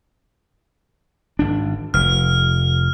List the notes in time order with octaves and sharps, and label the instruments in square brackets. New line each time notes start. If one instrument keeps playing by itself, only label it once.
[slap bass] G#1 D4
[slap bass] F1 [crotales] F6